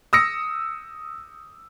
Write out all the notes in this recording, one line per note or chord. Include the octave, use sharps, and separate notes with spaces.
D#6 E6 A#6 C#7